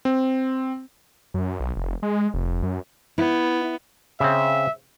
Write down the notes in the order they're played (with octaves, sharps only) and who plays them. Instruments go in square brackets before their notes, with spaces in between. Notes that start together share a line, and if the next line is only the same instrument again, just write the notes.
[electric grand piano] C4
[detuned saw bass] F#2
B1
F1
G#3
F1
F#2
[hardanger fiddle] B3 [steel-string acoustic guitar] E4
[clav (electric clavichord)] C#3 C4 [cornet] E5